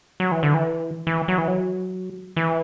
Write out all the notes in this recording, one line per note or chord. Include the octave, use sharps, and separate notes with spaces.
F#3
E3
D3
E3
E3
F#3
E3
F#3
E3